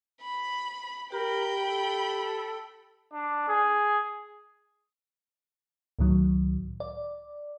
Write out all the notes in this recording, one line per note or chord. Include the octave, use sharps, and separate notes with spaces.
B5
G4 A#4 G5 B5
A4
D4
G#4
C#2 A2 D#3 F#3
D5